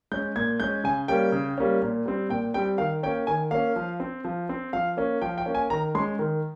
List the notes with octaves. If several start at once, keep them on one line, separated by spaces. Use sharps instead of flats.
G#3 C#4 G6
A#2 G#6
G#3 C#4 G6
C#3 G#5
G3 A#3 C#4 G5
C#3
G3 A#3 C#4
A#2
G3 C4
A#2 G5
G3 C4 G5
D#3 F5
A#3 C#4 G5
D#3 G#5
A#3 C#4 F5
F3
C4
F3
C4
F3 F5
A#3 C#4
F3 G5
G5
A#3 C#4
G#5
D#3 A#5
G#3 C#4 C6
D#3